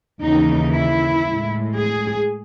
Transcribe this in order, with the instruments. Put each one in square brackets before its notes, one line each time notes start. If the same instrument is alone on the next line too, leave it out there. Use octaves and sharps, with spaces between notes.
[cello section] D#2 C#3 E3 D#4
E4
A2 G#3
G#4